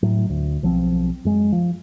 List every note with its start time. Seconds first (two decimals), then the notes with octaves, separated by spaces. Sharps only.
0.03 A2 F#3
0.29 D2
0.63 B1 F3 F#3 C4
1.25 F#2 G#3
1.52 F3